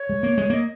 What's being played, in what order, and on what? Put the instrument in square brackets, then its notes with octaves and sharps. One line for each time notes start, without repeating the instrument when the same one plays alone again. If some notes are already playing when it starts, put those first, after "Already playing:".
Already playing: [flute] C#5
[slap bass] G#3
A#3
G#3
[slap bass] A#3 [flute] D#5